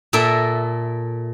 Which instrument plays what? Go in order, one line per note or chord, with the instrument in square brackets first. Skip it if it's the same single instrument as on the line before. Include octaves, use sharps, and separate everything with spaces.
[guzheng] A#2 A4 A#4 E5